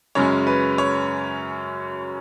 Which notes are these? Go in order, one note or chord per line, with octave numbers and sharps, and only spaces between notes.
F#2 C#3 G#3 C#4 C#5
B4
C#5